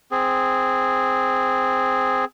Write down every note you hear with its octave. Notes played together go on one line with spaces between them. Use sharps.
C4 G#4